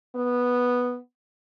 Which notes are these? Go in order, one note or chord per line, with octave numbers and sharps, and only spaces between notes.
B3